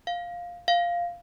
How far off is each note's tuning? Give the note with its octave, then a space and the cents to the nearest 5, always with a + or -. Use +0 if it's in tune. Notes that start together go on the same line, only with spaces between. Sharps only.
F5 +5
F5 -5